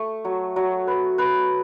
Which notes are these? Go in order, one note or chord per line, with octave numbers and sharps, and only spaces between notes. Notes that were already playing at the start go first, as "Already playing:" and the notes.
Already playing: A3
F#3
F#3
B4
B4